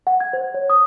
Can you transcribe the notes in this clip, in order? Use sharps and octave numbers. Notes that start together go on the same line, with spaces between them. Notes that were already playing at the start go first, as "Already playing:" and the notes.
F#5
G#6
C5
C#5
D#6